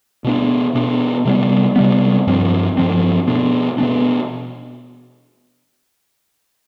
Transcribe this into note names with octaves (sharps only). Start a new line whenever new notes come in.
B2 B3 D4
B2 B3 D4
C3 G3 B3
C3 G3 B3
G2 F3 C4
G2 F3 C4
B2 B3 D4
B2 B3 D4